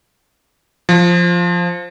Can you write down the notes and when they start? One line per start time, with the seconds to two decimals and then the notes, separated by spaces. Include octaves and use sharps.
0.89 F3